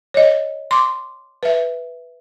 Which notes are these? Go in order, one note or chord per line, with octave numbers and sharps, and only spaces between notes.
C#5 D#5
C6 D6
B4 E5